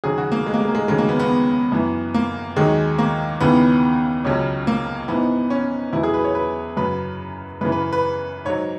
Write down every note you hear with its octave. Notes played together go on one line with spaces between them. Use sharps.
D#2 C#3 F#3 G#4
F#4
A#3
G#3
A#3
G#3
A#3
G#3
D#2 C#3 F#3 G#3
A#3
B3
B3
F#2 E3
A#3
D#2 D#3 F#3 G#3
A#3
D#2 C#3 E3 B3
C#2 C#3 F#3 C#4
A#3
G#2 E3 B3
C#4
E2 B2 F#3 E4
G#4
B4
C#5
B4
F#2 C#3 F#3 B4
F#2 C#3 E3 B4
B4
B4
G#2 F#3 C#5